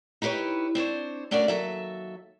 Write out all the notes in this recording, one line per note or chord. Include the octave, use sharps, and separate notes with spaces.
D#4 E4 G4 B4 C#5
C4 D4 C5 C#5
A3 C#4 D4 F#4 A#4 D5
D#2 F#3 A4 E5